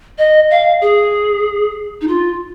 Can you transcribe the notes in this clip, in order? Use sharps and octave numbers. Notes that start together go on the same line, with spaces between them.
D#5
F5
G#4
D#4
F4